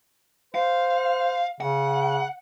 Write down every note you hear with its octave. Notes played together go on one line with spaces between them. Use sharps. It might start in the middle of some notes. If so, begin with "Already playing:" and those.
C5 F5
C#3 F#5